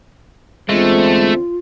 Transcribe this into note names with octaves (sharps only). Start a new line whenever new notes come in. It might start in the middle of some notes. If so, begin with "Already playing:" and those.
E2 D3 G#3 A3 C4 F4